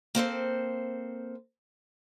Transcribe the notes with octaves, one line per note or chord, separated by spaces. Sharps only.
A#3 C4 A4 C5